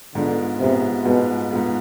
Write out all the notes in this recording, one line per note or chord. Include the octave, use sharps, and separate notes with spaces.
G#2 D3 G#3 B3 F4
G#2 C3 G#3 B3 F4
G#2 B2 G#3 B3 F4
G#2 G#3 B3 F4